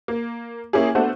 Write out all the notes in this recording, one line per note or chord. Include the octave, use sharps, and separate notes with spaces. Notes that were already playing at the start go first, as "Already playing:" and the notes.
A#3
A#3 C#4 E4 G4 G#4
A3 B3 D4 F#4 C5